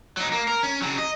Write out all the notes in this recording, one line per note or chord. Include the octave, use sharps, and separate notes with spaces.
F#3 D#4
A#3
A#4
C#4
C#3 F#3
D#5